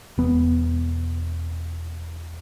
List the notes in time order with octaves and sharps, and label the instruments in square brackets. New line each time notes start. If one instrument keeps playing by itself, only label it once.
[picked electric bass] E1 B3